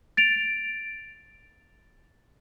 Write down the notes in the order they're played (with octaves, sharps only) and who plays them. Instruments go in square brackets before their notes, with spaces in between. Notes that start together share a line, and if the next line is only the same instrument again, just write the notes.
[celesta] A6 D7 F7